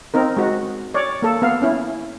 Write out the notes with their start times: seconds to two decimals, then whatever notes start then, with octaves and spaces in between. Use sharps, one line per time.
0.14 C4 D#4 A#4
0.36 G#3 F#4
0.94 C#5 D5
1.22 A#3 A4
1.42 B3 F5
1.62 C#4 E4